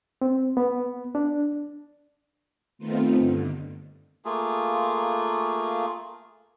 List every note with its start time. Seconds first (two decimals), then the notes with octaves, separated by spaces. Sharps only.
0.22 C4
0.57 B3
1.15 D4
2.78 D#3 A3 B3 C4 D#4 F4
3.18 G2 D3
4.25 A3 A#3 F4 G#4